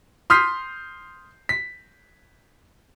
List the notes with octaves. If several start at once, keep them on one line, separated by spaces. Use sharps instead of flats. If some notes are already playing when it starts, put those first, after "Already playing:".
C6 D#6 F6 G6 B6 C7
B6